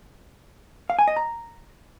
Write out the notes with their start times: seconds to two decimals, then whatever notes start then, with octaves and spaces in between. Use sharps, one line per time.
0.90 F5
0.99 G#5
1.08 D#5
1.16 A#5